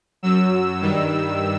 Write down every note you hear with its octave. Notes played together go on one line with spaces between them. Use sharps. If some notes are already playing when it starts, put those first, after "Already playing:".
F#2 F#3 E6
G2 D#3 G3